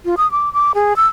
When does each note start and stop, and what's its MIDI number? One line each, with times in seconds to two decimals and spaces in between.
0.05 0.15 65
0.17 0.30 87
0.31 0.52 86
0.53 0.72 86
0.75 0.96 68
0.96 1.07 88